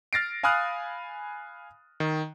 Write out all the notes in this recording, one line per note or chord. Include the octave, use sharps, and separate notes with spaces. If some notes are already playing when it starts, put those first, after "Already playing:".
F6 A6 A#6 C7 D7
F5 G#5 B5 D#6 F6 F#6
D#3